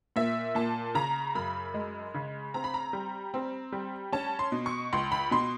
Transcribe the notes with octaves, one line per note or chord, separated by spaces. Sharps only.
A#2 E5
A#2 A5
C#3 A#5
F#2 B5
G#3
C#3
C4 A#5
B5
A#5
G3
C4
G3
C#4 A5
C6
B2
C#6
C#2 C6
B5
B2 C6